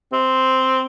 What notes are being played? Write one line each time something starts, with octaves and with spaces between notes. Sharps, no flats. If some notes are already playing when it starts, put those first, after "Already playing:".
C4